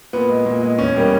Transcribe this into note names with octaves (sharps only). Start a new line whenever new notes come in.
A#2 B3
G#3
A#2
G#3
E2 C#4
B2 G3 A#3